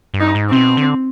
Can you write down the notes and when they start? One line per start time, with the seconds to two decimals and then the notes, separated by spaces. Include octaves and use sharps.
0.14 G2
0.20 D#4
0.35 G#2
0.49 C3 C4
0.56 B2
0.77 D3